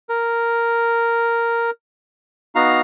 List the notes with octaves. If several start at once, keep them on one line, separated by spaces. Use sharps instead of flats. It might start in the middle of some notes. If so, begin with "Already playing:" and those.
A#4
B3 D#4 F#4 F5 A#5